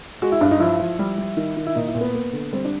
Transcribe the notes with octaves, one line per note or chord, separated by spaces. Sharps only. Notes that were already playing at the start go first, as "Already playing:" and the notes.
G#3 F#4
E4
G2 D4
D#4
F3 E4
F3
G3
G3
D#3
D#3
E4
A#2 D#4
E4
A#2
B3
A#3
D3
G3 C4
D4